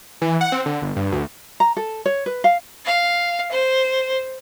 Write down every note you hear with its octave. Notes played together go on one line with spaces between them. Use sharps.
E3
F#5
C4
D3
G1
G2
D2
A#5
A4
C#5
B4
F5
F5
C5